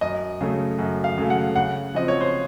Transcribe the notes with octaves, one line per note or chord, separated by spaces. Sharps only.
F#2 D#5
C#3 F#3 A3
F#2
F5
C#3 F#3 A3
F#5
C#3 F#5
F3 C4 D#5
C#5
C5